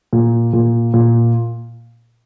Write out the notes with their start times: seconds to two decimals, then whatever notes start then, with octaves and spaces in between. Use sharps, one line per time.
0.13 A#2
0.53 A#2
0.94 A#2